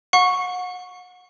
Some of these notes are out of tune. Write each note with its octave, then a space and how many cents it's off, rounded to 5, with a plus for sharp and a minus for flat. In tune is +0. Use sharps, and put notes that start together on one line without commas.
F#5 -35 C#6 +0